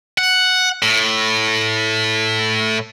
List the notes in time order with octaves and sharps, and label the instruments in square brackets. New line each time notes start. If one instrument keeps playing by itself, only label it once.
[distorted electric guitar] F#5
A2